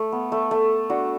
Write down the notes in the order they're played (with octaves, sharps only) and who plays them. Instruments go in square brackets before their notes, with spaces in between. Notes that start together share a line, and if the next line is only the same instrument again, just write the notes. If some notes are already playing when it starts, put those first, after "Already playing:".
Already playing: [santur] A3
B3
A3
A3
D4 F#4